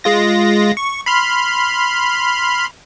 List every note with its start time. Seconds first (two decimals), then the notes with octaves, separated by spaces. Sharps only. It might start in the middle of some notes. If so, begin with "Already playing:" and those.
0.04 G#3 F4 A#6
0.77 C#6
1.06 B5 C6 F6